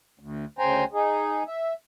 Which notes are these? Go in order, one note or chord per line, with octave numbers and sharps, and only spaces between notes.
D2
D2 C#3 C5 G5 G#5 A#5
D#4 G#4
E5